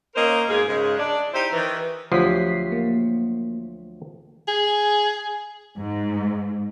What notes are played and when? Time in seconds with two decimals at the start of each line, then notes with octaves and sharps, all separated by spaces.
0.15 A#3 C#4 A#4 C5 D#5
0.48 G#2 B2 A#3 G#4
0.68 G#2 C#3 G#3
0.98 D4
1.33 D#4 E4 G4 C5
1.53 D#3 E3
2.12 D2 F3 F#3 G4 B6 C7
2.72 A#3
4.48 G#4
5.77 G#2